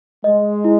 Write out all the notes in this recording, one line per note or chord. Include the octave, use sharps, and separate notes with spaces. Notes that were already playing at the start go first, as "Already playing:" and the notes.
G#3 D#5
E4